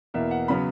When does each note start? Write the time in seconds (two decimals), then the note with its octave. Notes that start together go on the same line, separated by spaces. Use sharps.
0.14 E2 B2 A#3 E5
0.31 F#5
0.48 C#3 F#3 B3 B5